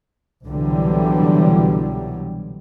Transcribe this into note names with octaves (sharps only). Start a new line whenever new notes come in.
C2 B2 D3 E3 F#3 G3